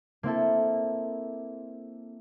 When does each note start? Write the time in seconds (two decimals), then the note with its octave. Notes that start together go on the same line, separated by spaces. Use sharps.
0.23 A#3 C4 E4 A4